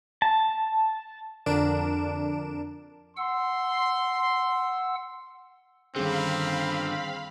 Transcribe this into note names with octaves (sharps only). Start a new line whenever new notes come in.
A5
F2 D3 D4 A#4 D7 E7
F#5 C6 E6
G2 D3 D#3 C4 C#4 G#4 F5 B5